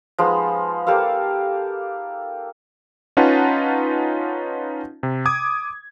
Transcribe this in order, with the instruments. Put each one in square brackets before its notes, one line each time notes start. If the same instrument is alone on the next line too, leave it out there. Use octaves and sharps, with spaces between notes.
[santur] F3 G#3 B3 D#4
A#3 G4 A4 F5
[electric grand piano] C#4 D#4 F4 B4 F#5 A5
C3
D6 D#6 G#6